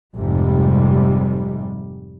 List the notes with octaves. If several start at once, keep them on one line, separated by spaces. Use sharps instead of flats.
F1 G#2 C3 G3